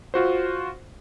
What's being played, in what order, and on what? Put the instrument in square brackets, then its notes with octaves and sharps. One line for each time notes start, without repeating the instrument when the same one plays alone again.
[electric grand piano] F4 F#4 C5